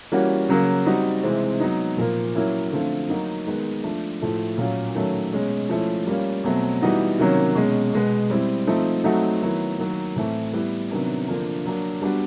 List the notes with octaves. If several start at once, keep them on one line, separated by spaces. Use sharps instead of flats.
E3 G3 A#3 C#4 F#4
C#3 F#3 A#3
G3 C4 D#4 F#4
C3 E3 G#3 C4
F#3 B3 D#4
A#2 F3 A#3
F#3 A#3 C#4 E4
D3 F3 A3 C4 F4
F#3 A#3 D#4 F#4
D#3 G#3 B3
F3 A3 D4
A2 F3 A3
A#2 F#3 A#3 C#4 F4
D#3 F#3 A3 C#4
B2 G#3 C#4
F3 A3 C#4 E4
G3 A#3 C#4 F4
B2 F#3 A3 C4
E3 G3 B3 D#4 F#4
C3 D#3 F#3 A#3 C#4
B2 G#3 C#4
B2 G#3 B3
G3 C4 E4
F3 A3 C4 D#4
F#3 A3 C4 D#4 F#4
D#3 F#3 B3 E4
D#3 F#3 A#3
A2 E3 A3 C4
G3 B3 E4
C3 D#3 F#3 B3 D4
D3 F3 A#3 D4
F#3 A#3 D4
G3 B3 D4 F#4